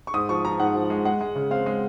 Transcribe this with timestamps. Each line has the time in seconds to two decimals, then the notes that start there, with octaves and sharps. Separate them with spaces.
0.07 C#6
0.14 G#2 D#6
0.29 F3 C#6
0.45 F3 A#5
0.60 G#2 F#5
0.75 F3
0.90 G#3
1.05 G#3 F#5
1.20 G#3
1.36 C#3
1.51 C4 F5
1.66 G#3